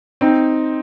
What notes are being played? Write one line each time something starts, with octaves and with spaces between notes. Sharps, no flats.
C4 D#4